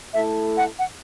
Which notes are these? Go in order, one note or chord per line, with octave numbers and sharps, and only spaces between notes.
A3 E4 A4 E5
F#5
F#5